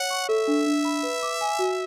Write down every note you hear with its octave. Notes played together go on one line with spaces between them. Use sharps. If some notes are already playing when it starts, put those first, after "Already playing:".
Already playing: C#5 F#5
C#6
A4 E5
D4
D4
B5
B4
D6
G#5
F#4